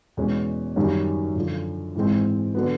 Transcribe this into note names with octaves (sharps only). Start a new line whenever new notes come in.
E2 B2 G#3 C#4
F#2 D#3 G3 A#3 C#4
F#2 D3 F3
G#2 E3 G#3 C4
D3 F#3 B3